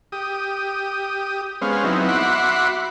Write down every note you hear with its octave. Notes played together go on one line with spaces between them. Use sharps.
G4 D#6
G#3 B3 C#4 C5 F5
F#3 B3 C4 D#4 E4
F#4 E5 F#5 B5 C6 D6